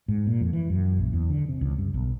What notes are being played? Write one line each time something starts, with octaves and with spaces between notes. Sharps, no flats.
G#2
A#2
F2
E3
F#2
A#1
E2
D3
C3
C#2
G2
B1